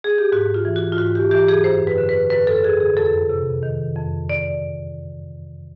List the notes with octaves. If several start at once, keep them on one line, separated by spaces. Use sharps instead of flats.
G#4
G4
G#2 F#4
F4
E3
F#4
F4
G#2 F#4
G4
E3 G4
G#4
F#2 C5
B4
D3
B4
F#2 B4
A4
D3 G#4
G#4
F2 A4
C3
D#3
F2
D5